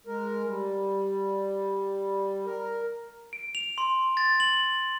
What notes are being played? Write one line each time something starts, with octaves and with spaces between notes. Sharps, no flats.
G#3 A#4
G3
A#4
D7
F7
C6
A6
F#7
F#7